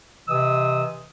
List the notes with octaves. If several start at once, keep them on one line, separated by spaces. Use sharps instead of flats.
C3 E3 D#5 D#6 E6